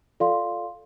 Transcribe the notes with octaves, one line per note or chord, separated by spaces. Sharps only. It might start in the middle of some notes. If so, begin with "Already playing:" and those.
F4 A4 D5 F5 C6